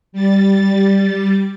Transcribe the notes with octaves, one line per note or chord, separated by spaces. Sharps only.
G3 A6